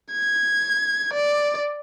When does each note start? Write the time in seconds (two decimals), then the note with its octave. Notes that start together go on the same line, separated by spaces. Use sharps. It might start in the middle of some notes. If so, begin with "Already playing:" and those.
0.13 G#6
1.13 D5